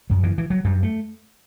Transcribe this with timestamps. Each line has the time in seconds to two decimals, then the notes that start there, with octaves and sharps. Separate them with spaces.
0.10 F#2 F#3
0.23 E3
0.38 E3
0.50 F#3
0.64 F#2 G3
0.83 A3